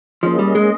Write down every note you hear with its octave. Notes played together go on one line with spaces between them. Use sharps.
F3 A#3 C#4 G#4 D#5
G3
G#3